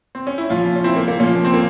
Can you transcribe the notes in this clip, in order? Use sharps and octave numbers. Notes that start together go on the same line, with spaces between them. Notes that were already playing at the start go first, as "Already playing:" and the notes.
C4
C#4
E4
A#2 F3 C#4 F4
C#4
C4 E4
A#3
A#3
A#2 F3 A#3 C#4
C4
A#3